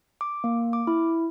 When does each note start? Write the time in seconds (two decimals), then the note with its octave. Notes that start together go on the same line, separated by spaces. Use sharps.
0.21 D6
0.44 A#3
0.73 D6
0.87 E4